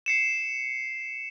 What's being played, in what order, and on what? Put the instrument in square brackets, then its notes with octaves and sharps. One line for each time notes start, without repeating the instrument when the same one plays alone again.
[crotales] C7 C#7 E7